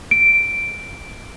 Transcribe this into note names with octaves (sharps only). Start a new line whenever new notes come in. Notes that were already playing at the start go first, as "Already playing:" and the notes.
D7